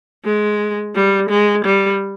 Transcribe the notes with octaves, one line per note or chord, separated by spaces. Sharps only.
G#3
G3
G#3
G3